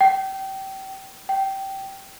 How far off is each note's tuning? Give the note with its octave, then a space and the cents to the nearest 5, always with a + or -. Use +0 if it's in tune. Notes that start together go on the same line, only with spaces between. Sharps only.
G5 -25
G5 -15